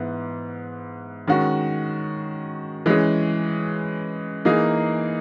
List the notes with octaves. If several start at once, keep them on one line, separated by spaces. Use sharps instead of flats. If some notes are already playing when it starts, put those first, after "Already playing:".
Already playing: G#2 E3 B3 E4
D#3 G#3 C#4 F#4
E3 G#3 C#4 G#4
E3 A#3 D#4 G#4